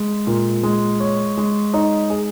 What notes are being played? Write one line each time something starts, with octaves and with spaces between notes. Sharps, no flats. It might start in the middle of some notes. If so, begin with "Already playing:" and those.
Already playing: G#3
A#2
G#3
C#5
G#3
D#4
G#4